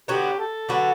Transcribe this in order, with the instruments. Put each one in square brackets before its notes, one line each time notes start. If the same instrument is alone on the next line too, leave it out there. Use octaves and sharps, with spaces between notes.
[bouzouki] D3 F#3 B3 F#4 [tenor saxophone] G4
[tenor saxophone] A4
[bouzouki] D3 F#3 B3 F#4